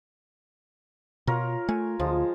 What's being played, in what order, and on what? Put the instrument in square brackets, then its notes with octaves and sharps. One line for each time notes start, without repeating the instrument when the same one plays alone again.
[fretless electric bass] B2 [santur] F4 A#4 C#5
[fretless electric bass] A3 [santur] G#5
[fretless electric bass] D2 [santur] F3 G#3